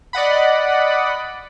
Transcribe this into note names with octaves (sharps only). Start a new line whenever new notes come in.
D5 D#5 F#5 B5